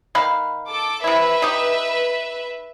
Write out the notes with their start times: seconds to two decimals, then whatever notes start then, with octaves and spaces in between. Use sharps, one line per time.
0.15 D#3 B4 F5
0.68 A4 D6
1.04 C3 E4 B4 E5
1.42 D#4 G4